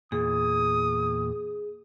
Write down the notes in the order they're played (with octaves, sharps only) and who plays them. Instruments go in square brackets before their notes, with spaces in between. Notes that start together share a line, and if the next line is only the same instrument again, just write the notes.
[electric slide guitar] E2 A#2 [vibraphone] G#4 [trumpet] D#6